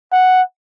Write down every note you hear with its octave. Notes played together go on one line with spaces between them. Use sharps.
F#5